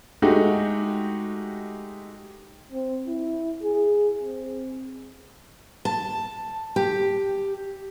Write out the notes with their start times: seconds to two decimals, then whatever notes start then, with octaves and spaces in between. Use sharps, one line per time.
0.22 G#3 A3 D#4 F#4 G4
2.72 C4
3.08 E4
3.63 G#4
4.23 C4
5.85 A5
6.76 G4